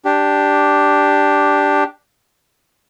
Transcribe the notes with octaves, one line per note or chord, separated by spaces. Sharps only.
D4 G4